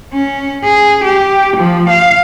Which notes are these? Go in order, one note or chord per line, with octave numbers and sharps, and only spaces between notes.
C#4
G#4
G4
F3
F5